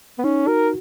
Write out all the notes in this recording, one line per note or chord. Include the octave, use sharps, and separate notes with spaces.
B3
C#4 D#4
F#4 A#4